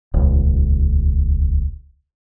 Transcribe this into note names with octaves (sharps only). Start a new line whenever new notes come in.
D#1 C#2